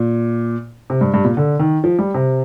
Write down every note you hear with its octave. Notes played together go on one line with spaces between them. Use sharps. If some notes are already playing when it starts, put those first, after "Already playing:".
Already playing: A#2
C3
G2
G2
A#2
D3
D#3
F3
G3
C3